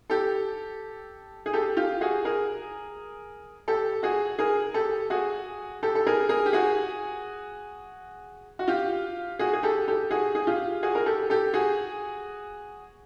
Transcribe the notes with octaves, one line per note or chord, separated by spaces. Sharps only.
G4 A4
G#4
G4 A4
F4 G4
F#4 G#4
G#4 A#4
G4 A4
F#4 G#4
G#4 A#4
G4 A4
F#4 G#4
G4 A4
A4
G#4 A#4
G#4 A#4
G4
F#4 G#4
F#4
F4 G4
F#4 G#4
G#4
G4 A4
G4 A4
F#4 G#4
G#4
F4 G4
F#4 G#4
A#4
G4 A4
G4 A4
F#4 G#4